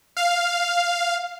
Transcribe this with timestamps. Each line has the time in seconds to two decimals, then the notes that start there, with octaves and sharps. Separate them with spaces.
0.17 F5